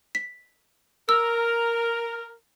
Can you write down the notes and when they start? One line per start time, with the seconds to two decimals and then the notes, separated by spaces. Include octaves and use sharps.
0.15 B6
1.09 A#4 E6